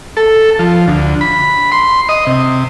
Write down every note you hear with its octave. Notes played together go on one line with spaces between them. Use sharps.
A4
F3
D2
B5
C6
D#5
C3